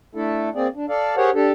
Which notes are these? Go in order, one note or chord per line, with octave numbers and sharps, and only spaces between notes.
A3 D4 E4 A4
A#3 C4 G#4 D5
D4
A4 D5 F5
G4 G#4 A#4 C5 C#5 F#5
D4 G4 A4